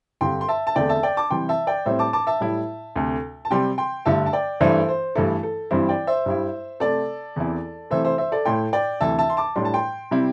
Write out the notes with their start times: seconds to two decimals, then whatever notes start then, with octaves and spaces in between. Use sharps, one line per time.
0.21 G2 D3 C4 G5 C6
0.41 C6
0.48 E5 A5
0.67 A5
0.76 E2 D3 A3 C4 D5 G5
0.89 E5 A5
1.03 D5 G5
1.17 A5 D6
1.30 C3 E3 G3 G5 C6
1.49 E5 A5
1.67 D5 G5
1.85 A2 G3 C4 C5 E5
1.99 A5 D6
2.13 A5 D6
2.27 E5 A5
2.40 A2 G3 E4
2.96 D2 C3 A3
3.45 A5
3.51 C3 G3 C4 G5 C6
3.78 G5 C6
4.05 G2 D3 A3 E5 A5
4.26 A5
4.33 D5 G5
4.60 G2 E3 A3 D4 C5 E5
4.78 A4
4.89 C5
5.15 G2 E3 A3 E4 A4
5.43 A4
5.71 G2 E3 G3 C4 E4 C5
5.89 D5 G5
6.07 C5 E5
6.26 G2 G3 E4
6.80 C3 A3 C4 A4 D5
7.36 E2 E3 C4 E4
7.91 C3 E3 A3 C5 E5
8.05 C5 E5
8.18 C5 E5
8.32 A4 D5
8.45 A2 A3 E4 G5 C6
8.73 D5 G5
9.01 D2 C3 E3 A3 E5 A5
9.19 E5 A5
9.30 C6
9.37 A5 D6
9.56 A2 G3 D4 C6
9.65 A5
9.74 G5 C6
10.11 C3 G3 C4 E4